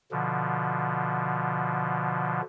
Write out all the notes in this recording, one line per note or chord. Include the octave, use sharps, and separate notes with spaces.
B2 D3 F3